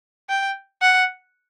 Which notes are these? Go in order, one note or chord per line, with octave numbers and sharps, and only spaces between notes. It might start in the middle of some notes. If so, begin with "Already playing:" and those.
G5
F#5